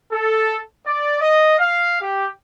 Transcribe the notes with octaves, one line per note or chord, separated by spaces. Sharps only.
A4
D5
D#5
F5
G4